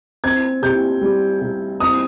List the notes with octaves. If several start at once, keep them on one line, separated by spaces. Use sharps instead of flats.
C4 G#6
C3 G6
G3
C3
C4 D#6